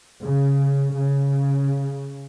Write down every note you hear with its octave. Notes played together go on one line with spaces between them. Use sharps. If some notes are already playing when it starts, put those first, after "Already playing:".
C#3
C#3